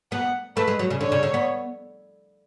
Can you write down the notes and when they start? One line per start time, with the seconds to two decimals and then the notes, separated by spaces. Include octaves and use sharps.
0.12 B3 F#5
0.57 A3 B4
0.68 G#3
0.79 F#3
0.90 C#3
1.01 D3 C#5
1.12 C#3
1.23 D3
1.34 B3